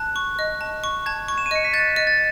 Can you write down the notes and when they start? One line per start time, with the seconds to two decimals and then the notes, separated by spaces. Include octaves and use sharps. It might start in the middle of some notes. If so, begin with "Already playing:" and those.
Already playing: A5 F#6
0.16 C#6
0.39 D#5
0.61 A5
0.84 C#6
1.06 A5 G#6
1.28 C#6
1.38 E7
1.46 D#7
1.51 D#5 C#7
1.65 B6
1.73 F#6 A6
1.96 D#5
2.07 A6